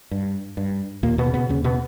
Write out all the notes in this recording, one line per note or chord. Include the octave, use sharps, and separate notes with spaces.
G2
G2
D#2 A#2 A#3
B2 B3
C#3
B2 B3
D#2 C#3 C#4
B2 B3